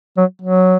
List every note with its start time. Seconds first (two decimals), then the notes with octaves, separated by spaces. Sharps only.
0.17 F#3
0.41 F#3